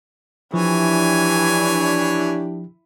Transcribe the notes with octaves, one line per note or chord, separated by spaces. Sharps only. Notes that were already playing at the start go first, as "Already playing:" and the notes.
E3 F3 D4 E4 G4 C#5 G#5